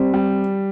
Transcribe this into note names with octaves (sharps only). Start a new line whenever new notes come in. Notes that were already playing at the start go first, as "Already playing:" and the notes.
Already playing: G3 C4
G3